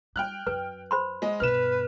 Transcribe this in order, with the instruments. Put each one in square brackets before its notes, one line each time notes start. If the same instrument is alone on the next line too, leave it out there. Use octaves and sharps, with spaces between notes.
[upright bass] G3 [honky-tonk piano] G5 F6 F#6
[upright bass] F#2 [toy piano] B4
[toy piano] C5 B5 C6
[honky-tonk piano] G#3 D#5
[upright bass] G2 B2 [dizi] B4 [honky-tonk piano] F6 E7